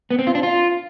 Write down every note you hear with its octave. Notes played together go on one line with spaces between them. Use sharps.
B3
C4
F4
D4
F4